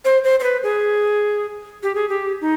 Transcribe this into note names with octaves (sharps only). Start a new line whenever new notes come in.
C5
C5
C5
B4
G#4
G4
G#4
G4
D#4